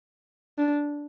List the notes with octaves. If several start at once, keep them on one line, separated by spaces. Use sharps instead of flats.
D4